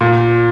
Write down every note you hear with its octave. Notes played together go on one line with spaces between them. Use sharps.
A#2